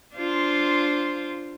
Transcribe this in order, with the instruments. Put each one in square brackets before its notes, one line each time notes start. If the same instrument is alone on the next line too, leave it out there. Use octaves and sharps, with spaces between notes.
[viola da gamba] D4 F4 C5